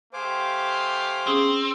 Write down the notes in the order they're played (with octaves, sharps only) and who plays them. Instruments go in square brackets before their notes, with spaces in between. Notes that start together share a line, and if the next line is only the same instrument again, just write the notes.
[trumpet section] A3 G4 F5 [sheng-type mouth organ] C5 G#5 D6
[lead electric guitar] C4 [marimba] C#4 G#4 D#6